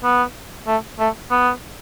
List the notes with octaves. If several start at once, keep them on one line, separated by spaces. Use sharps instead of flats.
B3
A3
A3
B3